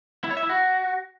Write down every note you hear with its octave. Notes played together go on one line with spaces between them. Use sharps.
E4
C#5
E5
E4
F#4